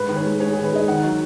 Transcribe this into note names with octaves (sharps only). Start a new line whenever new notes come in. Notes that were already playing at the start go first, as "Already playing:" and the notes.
Already playing: G#2 B4
D#3
C#5
G#3
G#3 C#5
D#3 G#4
B4
G#3 D#5
D#3 F#5
F#3